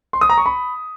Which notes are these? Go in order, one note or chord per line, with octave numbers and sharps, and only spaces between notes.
C6
D#6
A#5
C#6
B5